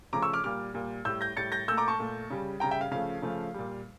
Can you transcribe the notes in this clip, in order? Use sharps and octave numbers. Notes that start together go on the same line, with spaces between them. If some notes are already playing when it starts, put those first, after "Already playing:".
C#3 F3 A3 A#5 D6
C#6 E6
D6 F6
A#2 G3 D6 F6
A#2 G3
A2 G3 E6 G6
G6 A#6
A2 G3 A6 C#7
G6 A#6
A#2 A3 E6 G6
A#5 D6
A5 C#6
A#2 A3
C#3 G3
C#3 G3 G5 A#5
E5 G5
F5
C#3 F3 A3 F5
C#3 F3 A3
A#2 G3